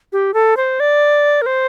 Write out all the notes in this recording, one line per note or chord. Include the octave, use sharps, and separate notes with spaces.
G4
A4
C5
D5
A#4
C5